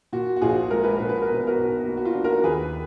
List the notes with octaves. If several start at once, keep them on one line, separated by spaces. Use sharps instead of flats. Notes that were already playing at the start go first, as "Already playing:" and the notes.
A#2 F#4
F#4
A#1 F4 G#4
G#3 A#4
B4
A#1 A#4
B4
A#4
B2
B4
F#4 A#4
B1
A#3 F#4
F#4
F4
D4
F#4 A#4
D#2 G#4 B4